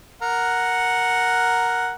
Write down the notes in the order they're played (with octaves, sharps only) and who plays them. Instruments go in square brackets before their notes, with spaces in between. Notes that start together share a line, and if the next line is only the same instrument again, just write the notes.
[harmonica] A#4 F#5